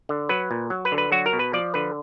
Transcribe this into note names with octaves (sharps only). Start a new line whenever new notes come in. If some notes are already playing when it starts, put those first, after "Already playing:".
D3
F#3 B4
A#2
F#3
B4
D3
B4
F#3 F#4
A#4
B2
B4
F3 D5
D3 B4